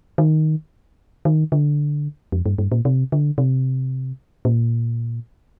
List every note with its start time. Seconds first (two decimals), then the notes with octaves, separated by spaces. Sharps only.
0.18 D#3
1.25 D#3
1.52 D3
2.32 F2
2.46 G2
2.58 G2
2.72 A#2
2.85 C3
3.12 D3
3.38 C3
4.45 A#2